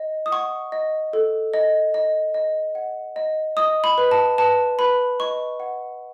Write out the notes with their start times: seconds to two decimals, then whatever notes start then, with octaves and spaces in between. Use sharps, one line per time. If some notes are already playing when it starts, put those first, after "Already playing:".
Already playing: D#5
0.26 D#6
0.32 F#5 C#6
0.72 D#5
1.13 A4
1.54 D#5
1.94 D#5
2.34 D#5
2.75 F#5
3.16 D#5
3.57 D#5 D#6
3.84 B5
3.98 B4
4.11 A5
4.38 B4 A5
4.79 B4 B5
5.20 D#5 C#6
5.60 F#5